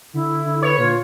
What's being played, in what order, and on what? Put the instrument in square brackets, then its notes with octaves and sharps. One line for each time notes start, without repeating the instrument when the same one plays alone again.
[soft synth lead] D3 [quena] E4
[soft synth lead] D3
[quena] B4 [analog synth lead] C#5
[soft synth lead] A#2 [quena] F4